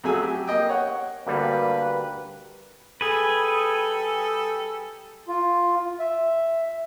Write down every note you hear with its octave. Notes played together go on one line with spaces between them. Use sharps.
F2 F#3 A3 G#4 G#5 E6
G4
A#3 D#5 G5
C#5 F#5
D2 G2 G3 A#3 B4
G3 G#4 A4 B4
F4
E5